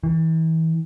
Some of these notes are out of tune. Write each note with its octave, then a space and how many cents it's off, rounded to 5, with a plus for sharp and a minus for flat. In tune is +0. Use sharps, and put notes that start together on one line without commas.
E3 -35